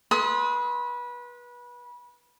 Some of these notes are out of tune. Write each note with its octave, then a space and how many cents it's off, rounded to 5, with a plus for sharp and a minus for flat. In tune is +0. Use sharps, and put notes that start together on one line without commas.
B4 -25 C6 +0 D#6 +35